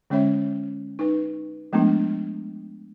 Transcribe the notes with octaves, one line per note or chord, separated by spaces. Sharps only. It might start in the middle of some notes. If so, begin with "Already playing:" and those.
D3 G#3 C#4 C#5 E5
D#4 B4
F3 G#3 A3 B3 D4